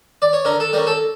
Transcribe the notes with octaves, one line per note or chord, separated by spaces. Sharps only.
D5
C#5
D3 A#4
A4
G3 C#4 A#4
A4